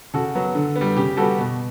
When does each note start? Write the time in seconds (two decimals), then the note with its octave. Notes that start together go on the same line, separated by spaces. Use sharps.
0.14 C#3 F#4 A4
0.35 F#3 B3
0.55 D3
0.76 B3
0.81 G3
0.97 C#3 G4
1.17 G3 B3 F#4 A4
1.38 B2